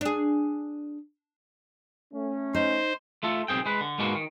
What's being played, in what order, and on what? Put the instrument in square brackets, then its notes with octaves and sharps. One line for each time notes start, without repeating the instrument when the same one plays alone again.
[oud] D4 G#4
[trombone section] A3 C#4
[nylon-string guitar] D#4 [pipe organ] C5
[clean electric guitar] A3 F4 A4
B1 B2 C4 G#4 G5
G#3 B4
D3
G#2 B2 G#3 A#3 F#4
D#3